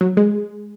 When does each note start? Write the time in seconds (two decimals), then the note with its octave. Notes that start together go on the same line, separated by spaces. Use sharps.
0.01 F#3
0.17 G#3